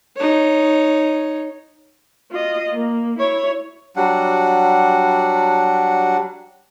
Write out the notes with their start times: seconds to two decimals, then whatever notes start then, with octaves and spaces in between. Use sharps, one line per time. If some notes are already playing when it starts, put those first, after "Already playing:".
0.16 D#4 C#5
2.31 F4 D#5
2.73 A#3
3.18 E4 C#5
3.96 F#3 G3 D4 F#5